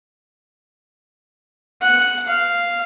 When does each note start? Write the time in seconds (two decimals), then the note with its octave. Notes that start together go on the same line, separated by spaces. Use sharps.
1.82 F#5
2.28 F5